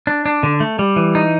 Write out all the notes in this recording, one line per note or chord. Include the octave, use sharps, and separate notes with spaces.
D4
D4
D3
A3
G3
E3
D#4